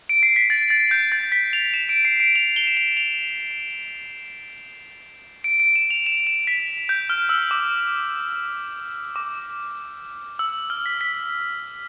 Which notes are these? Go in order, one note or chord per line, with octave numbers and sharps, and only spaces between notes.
D7
C7
B6
A6
A6
G6
A6
B6
F7
E7
D7
C7
D7
F7
G7
E7
F7
F7
D7
D7
E7
F7
E7
E7
B6
G6
F6
E6
D6
D6
E6
F6
B6
B6